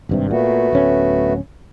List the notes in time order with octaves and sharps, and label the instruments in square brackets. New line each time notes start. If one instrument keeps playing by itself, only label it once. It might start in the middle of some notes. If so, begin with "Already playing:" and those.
[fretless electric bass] G#1 G2 C3
[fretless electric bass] A#2 [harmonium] A3 B3 F#4
[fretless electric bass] D1 C#4